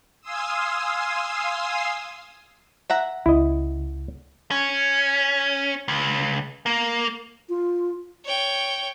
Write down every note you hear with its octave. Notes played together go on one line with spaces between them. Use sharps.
F5 G#5 C6 D#6 E6
E5 F#5 A#5
C#2 E4 D#5
C#4
C#2
A#3
F4
C#5 G5